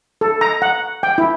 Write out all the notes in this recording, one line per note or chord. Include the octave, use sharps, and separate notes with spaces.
A4
A#5
F#5
G5
E4